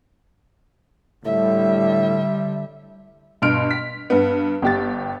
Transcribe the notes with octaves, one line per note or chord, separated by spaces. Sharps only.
A2 D3 G3 E5
G2 B2 C6 F6 D7
B6
G2 B3
G1 G4 A6